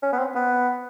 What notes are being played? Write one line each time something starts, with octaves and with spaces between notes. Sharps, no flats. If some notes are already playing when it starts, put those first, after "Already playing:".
C#4
B3
C4
B3